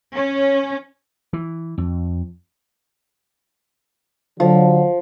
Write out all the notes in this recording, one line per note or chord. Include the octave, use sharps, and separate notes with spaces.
C#4
E3
F2
D3 F3 F#3